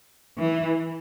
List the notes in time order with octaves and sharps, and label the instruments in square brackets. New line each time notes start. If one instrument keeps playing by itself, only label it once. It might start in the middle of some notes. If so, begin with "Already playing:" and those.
[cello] E3